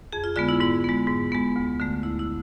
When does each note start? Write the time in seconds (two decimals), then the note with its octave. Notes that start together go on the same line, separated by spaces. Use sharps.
0.12 F2 G#4
0.24 F4
0.36 D3 G#3 B3 F4
0.49 E4
0.60 G#2 E4
0.84 G#3 B3
1.07 G#2
1.32 G#3 B3
1.56 D2
1.80 D3 A3
2.03 D2 E4
2.19 E4